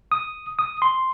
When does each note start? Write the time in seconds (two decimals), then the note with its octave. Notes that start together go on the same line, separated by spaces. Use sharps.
0.12 D#6
0.59 D#6
0.82 C6